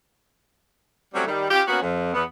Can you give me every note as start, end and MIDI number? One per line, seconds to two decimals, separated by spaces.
1.14 1.24 54
1.14 1.24 55
1.14 1.24 57
1.14 1.24 60
1.14 1.24 61
1.27 1.47 51
1.27 1.47 55
1.51 1.62 61
1.51 1.62 65
1.51 1.62 67
1.68 1.81 58
1.68 1.81 59
1.68 1.81 61
1.68 1.81 66
1.83 2.13 41
2.14 2.23 40
2.14 2.23 59